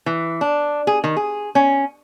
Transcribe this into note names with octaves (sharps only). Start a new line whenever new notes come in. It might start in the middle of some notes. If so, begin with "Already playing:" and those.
E3
D4
G#4
D#3
G#4
C#4